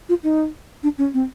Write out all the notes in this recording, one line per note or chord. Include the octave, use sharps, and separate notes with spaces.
F4
D#4
D4
C#4
C4